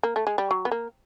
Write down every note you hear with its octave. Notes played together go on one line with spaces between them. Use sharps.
A#3
A3
G#3
G3
F#3
B3
A#3